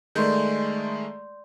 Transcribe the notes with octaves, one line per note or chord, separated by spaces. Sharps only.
D#3 G#3 A3 D5 C6 G6